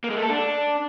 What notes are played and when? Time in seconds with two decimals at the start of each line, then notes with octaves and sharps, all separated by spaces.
0.04 A#3
0.10 G#3
0.16 A3
0.23 A4
0.29 D4